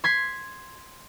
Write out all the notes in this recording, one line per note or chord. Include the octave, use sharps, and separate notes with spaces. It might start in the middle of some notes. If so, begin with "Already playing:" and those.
C6 G#6 B6